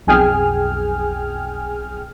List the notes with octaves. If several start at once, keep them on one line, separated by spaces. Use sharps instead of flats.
B1 F2 G#4 G5 G#5 F6